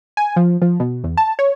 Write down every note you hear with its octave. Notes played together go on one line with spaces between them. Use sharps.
G#5
F3
F3
B2
E2
A5
C#5